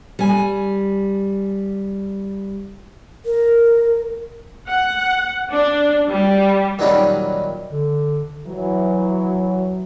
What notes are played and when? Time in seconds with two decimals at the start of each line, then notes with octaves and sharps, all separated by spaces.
0.19 G3 G#5
3.26 A#4
4.67 F#5
5.50 D4
6.09 G3
6.79 A#2 D#3 F#3 G3 C#4 D4
7.67 D3
8.47 E3 F#3